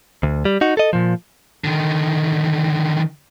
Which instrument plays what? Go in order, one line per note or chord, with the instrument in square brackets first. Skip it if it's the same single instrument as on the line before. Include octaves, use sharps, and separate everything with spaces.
[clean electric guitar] D2
G3
D#4 F#4
A4 D#5
A#2 F3
[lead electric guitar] D3 D#3